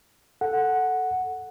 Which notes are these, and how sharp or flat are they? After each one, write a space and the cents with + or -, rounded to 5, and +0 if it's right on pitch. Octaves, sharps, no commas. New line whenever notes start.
A4 +0 F#5 +0